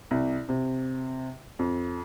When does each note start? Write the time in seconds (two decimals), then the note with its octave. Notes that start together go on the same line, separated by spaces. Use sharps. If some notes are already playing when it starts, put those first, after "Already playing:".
0.11 C2
0.49 C3
1.59 F2